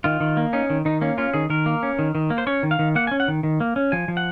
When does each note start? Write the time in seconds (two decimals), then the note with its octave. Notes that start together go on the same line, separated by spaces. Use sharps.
0.04 D#3 F4
0.20 D#3
0.37 A#3
0.53 C#4 D#4
0.70 D#3
0.85 D#3 D#4
1.01 A#3 C#4
1.18 C#4 F4
1.34 D#3 G#4
1.50 D#3 A#4
1.66 A#3
1.83 C#4
1.99 D#3
2.15 D#3
2.30 A#3
2.38 C5
2.47 C#4 C#5
2.63 D#3
2.71 F5
2.79 D#3
2.95 A#3 F#5
3.07 G#5
3.11 C#4
3.20 F#5
3.28 D#3
3.43 D#3
3.60 A#3
3.76 C#4
3.92 F3 G#5
4.08 F3
4.17 F#5